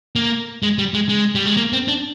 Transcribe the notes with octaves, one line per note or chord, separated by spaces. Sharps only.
A#3
G#3
G3
G#3
G#3
G3
G#3
A#3
C4
D4